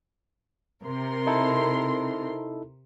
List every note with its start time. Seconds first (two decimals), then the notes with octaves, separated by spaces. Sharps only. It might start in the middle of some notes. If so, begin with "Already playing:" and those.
0.84 C3 A#4 C6
1.27 D#4 E4 A4